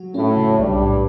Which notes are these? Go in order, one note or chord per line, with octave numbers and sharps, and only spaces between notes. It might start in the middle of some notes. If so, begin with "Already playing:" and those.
Already playing: F#3 F#4
A2 A3 C#4
C#3
B1 G2 G3
A2